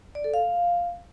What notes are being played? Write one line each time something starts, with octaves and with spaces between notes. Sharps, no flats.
D5
A4
F5